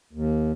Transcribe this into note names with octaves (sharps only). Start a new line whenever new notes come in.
D#2